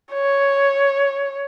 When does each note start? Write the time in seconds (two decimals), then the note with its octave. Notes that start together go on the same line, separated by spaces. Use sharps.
0.13 C#5